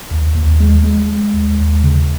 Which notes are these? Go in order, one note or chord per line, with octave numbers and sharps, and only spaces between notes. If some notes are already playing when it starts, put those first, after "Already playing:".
D#2
D#2
G#3
G#3
G#3
D#2
D#2
C#3